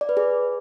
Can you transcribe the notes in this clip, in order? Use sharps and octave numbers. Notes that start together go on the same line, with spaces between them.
D5
B4
G#4